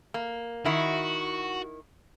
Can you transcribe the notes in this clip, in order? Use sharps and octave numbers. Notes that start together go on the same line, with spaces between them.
A#3
D#3 E4 F#4